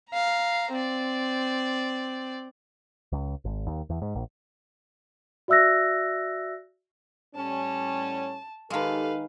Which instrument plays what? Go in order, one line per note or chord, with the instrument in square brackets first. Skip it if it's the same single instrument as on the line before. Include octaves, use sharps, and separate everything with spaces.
[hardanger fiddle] F5 A#5
C4 D5
[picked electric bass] C#2
G#1
D#2
E2
G#2
A#1
[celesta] F#4 D5 E5 E6 F#6 A#6
[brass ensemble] A2 G3 C#4 [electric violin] A5
[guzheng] D#3 G#3 [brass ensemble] G4 A4 [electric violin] B4 F5